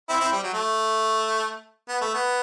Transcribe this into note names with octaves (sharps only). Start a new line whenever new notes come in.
C4 E4
C4 E4
G3
F#3
A3
B3
A3
B3